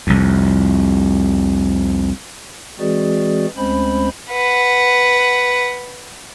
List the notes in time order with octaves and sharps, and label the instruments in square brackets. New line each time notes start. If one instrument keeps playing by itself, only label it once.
[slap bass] C2 F2
[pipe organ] E3 G#3 C4 F#4 G#4 D5
D2 G#3 C4 C#4 C5 B5
[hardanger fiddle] B4 F#5